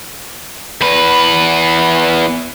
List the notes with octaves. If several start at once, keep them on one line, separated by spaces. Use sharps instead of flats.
E2 B4